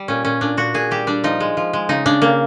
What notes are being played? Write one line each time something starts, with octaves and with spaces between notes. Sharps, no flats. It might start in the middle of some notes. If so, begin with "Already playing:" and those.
Already playing: G3
A#2 C#4
A#2 C#4
A#2 D4
A#2 F#4
A#2 G#4
G3 G4
G3 D4
F3 D#4
G#3
F3
G#3
C#3 D#4
C#3 D4
C#3 A#3